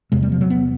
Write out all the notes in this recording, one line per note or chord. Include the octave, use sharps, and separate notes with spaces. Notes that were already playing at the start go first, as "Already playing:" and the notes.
E2 C3 G#3
G3
F3
F#3
B3